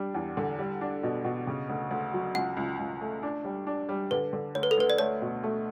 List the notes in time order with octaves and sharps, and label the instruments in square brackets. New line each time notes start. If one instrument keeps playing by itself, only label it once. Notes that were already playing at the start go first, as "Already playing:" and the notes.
Already playing: [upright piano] G3 D4
E2
D3
G3
D4
B2
B2
C#3
D2
D2
F#3
[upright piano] C#2 [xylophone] F#5
[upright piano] C#2
C#2
A3
D4
G3
D4
G3
[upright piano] D3 [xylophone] B4
[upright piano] D3
[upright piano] D2 [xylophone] C#5
[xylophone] B4
A4
[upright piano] D2 [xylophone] B4
[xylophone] D5
[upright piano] A3 [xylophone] C#5
[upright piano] B2
A3